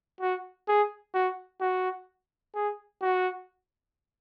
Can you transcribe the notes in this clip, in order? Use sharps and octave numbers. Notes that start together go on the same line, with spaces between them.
F#4
G#4
F#4
F#4
G#4
F#4